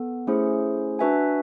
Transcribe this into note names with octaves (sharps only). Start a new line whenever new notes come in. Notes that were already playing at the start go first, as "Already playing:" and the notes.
Already playing: B3 A4
A3 C#4 E4 G#4 C5
D4 F#4 B4 E5 G#5